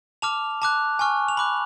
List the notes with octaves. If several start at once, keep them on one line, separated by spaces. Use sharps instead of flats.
A5 D6 F6 F7
A5 D6 F#6
G#5 C#6 F6
F7
B5 D6 F#6 F#7